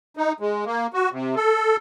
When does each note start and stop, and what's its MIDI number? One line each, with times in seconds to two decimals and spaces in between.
0.17 0.32 63
0.40 0.65 56
0.65 0.87 58
0.94 1.09 66
1.12 1.35 48
1.36 1.77 69